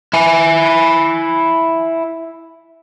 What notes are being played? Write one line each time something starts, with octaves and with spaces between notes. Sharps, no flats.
E4 G#5